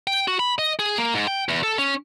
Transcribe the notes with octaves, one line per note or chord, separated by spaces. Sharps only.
G5
F#4
B5
D#5
G#4
A#3
G#2
G5
E2
A4
C#4